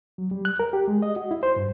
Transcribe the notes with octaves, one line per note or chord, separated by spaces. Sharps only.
F#3
G3
F#6
A#4
G4
G#3
D#5
F#4
E4
C5
G2